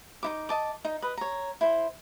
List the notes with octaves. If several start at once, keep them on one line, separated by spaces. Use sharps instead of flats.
D#4 E4 D6
D#5 A5 D6
D#4
B4 D#5
C#5 A#5
E4 C5